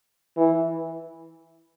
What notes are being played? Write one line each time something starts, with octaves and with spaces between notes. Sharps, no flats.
E3